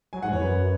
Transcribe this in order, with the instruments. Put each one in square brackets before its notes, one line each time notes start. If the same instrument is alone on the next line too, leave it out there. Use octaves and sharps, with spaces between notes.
[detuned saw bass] F#3 [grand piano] G#5
[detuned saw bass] G#2 [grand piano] F#5
[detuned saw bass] E2 [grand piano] C#5
[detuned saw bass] F#2 [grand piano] B4